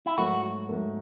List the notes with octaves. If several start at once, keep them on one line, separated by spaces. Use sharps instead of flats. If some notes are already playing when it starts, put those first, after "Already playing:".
E4
G#2 F#3 A3 F#4
G#2 F#3 A3